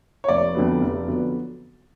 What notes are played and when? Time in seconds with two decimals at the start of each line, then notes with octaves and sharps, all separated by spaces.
0.24 C#5
0.28 F1 D5
0.55 F2 D3 F#3 B3
0.81 F1
1.07 F2 D3 F#3 B3